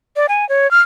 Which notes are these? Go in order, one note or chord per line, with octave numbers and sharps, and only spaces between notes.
D5
G#5
C#5
F6